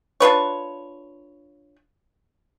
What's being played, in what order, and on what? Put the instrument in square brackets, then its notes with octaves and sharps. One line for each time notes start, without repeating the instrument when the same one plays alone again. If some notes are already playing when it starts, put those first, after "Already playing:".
[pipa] D4 F4 B4 C#5